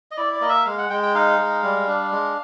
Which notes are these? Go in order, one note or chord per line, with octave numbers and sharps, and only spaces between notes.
D#5
E4 D5
D5
A#3 D#5
E5
G#3 F5
F#5
G#3 G5
G5
D#4 F5
G#3
G3
D4
G#3